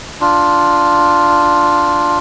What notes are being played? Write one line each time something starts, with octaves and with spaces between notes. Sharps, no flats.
D4 F4